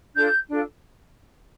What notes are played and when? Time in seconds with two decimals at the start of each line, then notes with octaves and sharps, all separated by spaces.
0.15 D4 F4 A4 G6
0.48 D4 F4 A4